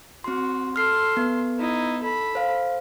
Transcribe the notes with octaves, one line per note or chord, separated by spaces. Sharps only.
C4 F#4 C6
A4 C6 F6 C7
B3
D#4 E4
A4 B5
C5 F5